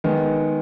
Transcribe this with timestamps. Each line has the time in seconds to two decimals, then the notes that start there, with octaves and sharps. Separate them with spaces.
0.04 D#3 G#3 B3